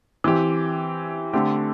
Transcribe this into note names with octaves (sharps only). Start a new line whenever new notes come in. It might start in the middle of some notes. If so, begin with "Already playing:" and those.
E3 C4 G4
D3 A3 C4 G4